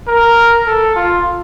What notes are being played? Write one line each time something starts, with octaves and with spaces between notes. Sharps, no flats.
A#4
A4
F4